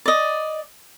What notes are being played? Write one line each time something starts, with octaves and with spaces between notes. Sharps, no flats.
D5 D#5